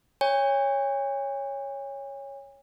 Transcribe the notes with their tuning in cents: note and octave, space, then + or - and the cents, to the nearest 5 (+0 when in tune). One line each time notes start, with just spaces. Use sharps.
C#5 +0 G#5 -40